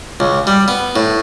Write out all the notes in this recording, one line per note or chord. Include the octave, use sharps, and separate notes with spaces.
C#2
G3
B3
A2